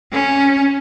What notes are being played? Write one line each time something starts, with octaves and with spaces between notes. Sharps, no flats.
C#4